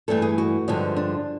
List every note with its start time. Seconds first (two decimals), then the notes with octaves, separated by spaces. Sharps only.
0.08 G2 E3 A3 A4
0.22 G#4
0.38 F#4
0.68 G2 D3 F3 G#3
0.97 D4